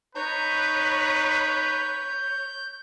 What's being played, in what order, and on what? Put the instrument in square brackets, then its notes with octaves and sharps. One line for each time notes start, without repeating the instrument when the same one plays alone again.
[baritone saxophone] D#4 [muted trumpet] B4 [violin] C#5 [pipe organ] G6